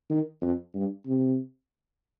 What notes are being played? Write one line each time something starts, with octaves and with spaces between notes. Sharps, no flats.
D#3
F2
G2
C3